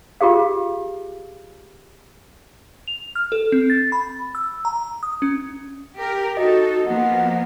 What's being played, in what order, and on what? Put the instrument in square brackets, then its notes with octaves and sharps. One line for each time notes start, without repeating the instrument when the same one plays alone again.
[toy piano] F4 G4 G#4 F5
[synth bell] F7
F6
A4
C4
A6
B5
E6
A#5
D#6
C#4
[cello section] G4 A#4
[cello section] D#4 A4 [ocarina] F#4 [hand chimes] D#5
[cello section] F3 A#3 B3 [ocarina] F#5